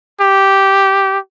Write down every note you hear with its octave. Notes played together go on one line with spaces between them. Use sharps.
G4